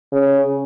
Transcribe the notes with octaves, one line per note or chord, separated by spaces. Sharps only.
C#3